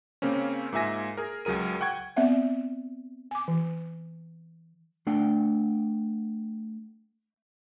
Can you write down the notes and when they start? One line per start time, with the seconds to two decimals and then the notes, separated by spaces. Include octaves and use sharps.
0.22 C#3 A#3 C4 C#4
0.73 G#2 A#3 F4 E5 G#5 A#6
1.17 G#4 A#4
1.45 C#2 F#3 G#4 A#4 D#7
1.81 F#5 G5 C#6 G#6
2.16 B3 C4 D5 E5 F#5
3.31 G#5 D6
3.48 E3
5.07 A3 D4 F#5 G5